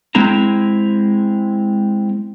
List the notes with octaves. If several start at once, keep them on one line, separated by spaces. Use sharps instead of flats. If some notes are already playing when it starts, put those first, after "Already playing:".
G#3 C4 E4 G#4 A#5